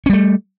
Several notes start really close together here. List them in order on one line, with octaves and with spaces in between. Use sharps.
C#4 G3 A3